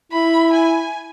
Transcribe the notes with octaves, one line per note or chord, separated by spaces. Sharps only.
E4 B5
G#5